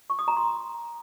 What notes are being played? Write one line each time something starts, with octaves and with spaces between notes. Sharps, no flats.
C#6
D#6
A#5
C6